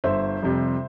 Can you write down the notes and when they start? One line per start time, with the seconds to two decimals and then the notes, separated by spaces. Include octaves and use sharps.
0.04 G1 C5 E5
0.42 F2 C3 G3